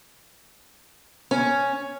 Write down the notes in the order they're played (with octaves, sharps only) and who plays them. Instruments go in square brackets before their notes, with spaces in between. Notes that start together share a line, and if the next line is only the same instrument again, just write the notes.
[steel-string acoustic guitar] C#4